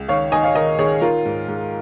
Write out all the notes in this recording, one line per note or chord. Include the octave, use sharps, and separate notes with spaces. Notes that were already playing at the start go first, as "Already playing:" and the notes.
Already playing: C#2
D#3 C#5 F5
D#3 D#5 G#5
C#5 F5
D#3 A#4 D#5
D#3 G#4 C#5
D#3 F4 A#4
G#2
G#2